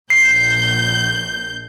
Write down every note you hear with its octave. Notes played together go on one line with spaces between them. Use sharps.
A#1 G6 C7